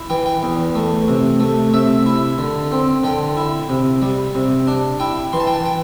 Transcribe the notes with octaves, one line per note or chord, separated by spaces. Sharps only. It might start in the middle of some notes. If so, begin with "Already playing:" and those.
Already playing: E4
E3 G5
G5
E2
A3
C3
A3
C3 E5
E4
D3
C4
D3 G5
E4
C3
G3
C3
D4
E4 G5
E3 C6
A5
G5
A5
G5